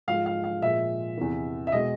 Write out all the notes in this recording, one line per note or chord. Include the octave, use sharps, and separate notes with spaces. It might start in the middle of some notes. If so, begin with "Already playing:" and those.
G#2 F3 G#3 F5
F5
F5
A#2 F3 G#3 E5
E2 C3 E3
E5
B2 G#3 D#5